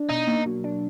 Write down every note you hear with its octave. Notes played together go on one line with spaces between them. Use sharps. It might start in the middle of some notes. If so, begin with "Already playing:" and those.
Already playing: D4
B2 D#4
A#3
F#3
D4